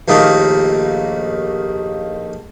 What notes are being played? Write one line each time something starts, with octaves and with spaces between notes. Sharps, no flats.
A#1 D#2 D#3 A3 A#3